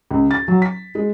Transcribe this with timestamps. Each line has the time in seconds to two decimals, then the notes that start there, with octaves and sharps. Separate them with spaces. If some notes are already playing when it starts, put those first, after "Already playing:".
0.11 C#2
0.31 A6
0.48 F#3
0.62 B6
0.95 G#3